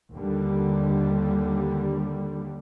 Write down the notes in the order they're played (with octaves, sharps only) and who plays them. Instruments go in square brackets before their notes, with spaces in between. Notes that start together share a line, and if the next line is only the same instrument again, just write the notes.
[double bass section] D#2 D3 G3